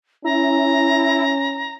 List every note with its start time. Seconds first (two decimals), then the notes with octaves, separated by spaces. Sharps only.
0.24 C#4 E4 A#5